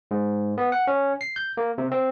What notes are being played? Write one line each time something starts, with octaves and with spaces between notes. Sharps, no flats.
G#2
B3
F#5
C#4
C7
G6
A#3
C3
C4